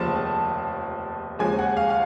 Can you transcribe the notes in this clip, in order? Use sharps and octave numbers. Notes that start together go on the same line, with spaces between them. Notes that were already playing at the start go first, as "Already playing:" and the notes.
Already playing: F1 D#2 C#3 F3 A5
D#2 C#3 F3 G#3 G#5
F#5
F5
F5